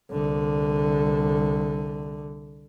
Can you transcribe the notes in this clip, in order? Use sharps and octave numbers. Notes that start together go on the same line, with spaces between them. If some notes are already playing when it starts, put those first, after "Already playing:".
C2 D3